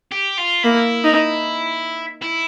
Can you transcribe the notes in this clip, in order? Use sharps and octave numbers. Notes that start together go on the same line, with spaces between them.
G4
F4
A#3 E4
D#4
E4